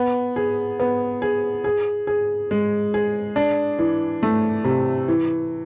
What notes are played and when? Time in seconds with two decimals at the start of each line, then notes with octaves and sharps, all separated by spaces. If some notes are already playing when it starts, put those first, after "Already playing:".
Already playing: B3
0.36 G#4
0.80 B3
1.22 G#4
1.64 G#4
2.07 G#4
2.51 G#3
2.94 G#4
3.36 D4
3.79 E3
4.23 A3
4.64 C3
5.08 E3